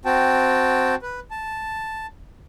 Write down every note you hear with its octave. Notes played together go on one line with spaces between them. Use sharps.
C4 F#4 G5 A5
B4
A5